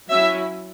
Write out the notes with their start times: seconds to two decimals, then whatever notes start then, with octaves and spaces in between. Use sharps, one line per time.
0.10 F#3 C#4 E4 E5